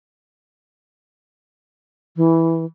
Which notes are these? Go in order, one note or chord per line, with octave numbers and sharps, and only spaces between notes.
E3